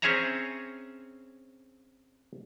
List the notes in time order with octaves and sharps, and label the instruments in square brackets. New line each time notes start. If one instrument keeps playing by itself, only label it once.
[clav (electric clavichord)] C4 C#4 G#4 C#5 E5 A#5